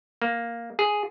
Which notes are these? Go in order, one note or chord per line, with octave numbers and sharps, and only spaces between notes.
A#3
G#4